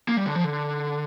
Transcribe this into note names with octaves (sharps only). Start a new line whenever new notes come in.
A#3
G3
D3
F3
D3